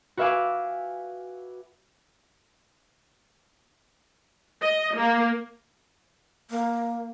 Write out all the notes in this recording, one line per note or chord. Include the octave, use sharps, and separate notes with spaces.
F#4 B4 E5 F5 G#5 D6
D#5
A#3
A#3